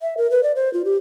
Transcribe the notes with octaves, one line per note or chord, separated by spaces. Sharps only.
E5
A#4
B4
D5
C5
F4
G4